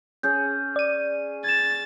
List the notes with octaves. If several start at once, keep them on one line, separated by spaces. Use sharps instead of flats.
C#4 G#4 G6
D5 D#7
G#6 A6 E7